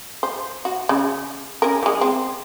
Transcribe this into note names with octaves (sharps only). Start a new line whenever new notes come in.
C5
F#4
C#3
C#4 A#4
E3 G#3
C4